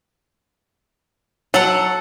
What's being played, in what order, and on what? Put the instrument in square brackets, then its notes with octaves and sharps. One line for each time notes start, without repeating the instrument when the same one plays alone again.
[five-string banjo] F#3 [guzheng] A4 F#5